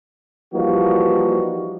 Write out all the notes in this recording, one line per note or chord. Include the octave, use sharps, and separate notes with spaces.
E3 F3 G3 A#3 D#4 F#4